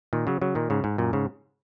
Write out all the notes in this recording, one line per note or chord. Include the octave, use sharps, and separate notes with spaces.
A#2 D#3
C#3 F#3
C#3 F#3
A#2 D#3
G#2 C#3
G#2
F#2 A#2
G#2 C#3